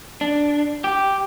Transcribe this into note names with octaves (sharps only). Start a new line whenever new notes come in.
D4
G4